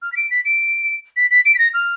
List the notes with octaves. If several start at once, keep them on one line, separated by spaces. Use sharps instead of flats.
F6
B6
D7
B6
D7
B6
B6
D7
B6
A#6
F6